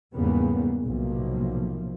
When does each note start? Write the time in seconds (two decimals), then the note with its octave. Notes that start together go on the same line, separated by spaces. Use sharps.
0.14 E2 G#2 C#3 G3 A#3 B3
0.84 B1 A2 C3 F3 A#3